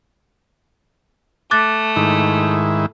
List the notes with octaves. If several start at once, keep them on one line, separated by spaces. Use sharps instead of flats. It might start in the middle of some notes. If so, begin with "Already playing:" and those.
A3 D6 F#6 A6
G#2 D#3 E4